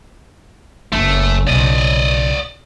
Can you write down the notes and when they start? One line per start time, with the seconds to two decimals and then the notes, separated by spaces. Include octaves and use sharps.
0.92 F#1 F#3 A3
1.47 B1 C#3 D5 D#5